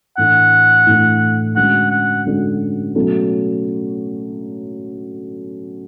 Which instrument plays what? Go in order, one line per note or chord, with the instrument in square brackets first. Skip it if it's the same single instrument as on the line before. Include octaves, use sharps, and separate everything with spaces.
[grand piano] A2 E3 A3 D4 [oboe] F#5
[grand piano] A2 E3 A3 D4
[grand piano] D3 G#3 C#4 F#4 [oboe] F#5
[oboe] F#5
[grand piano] D3 G#3 C#4 F#4
B2 F#3 A3 C#4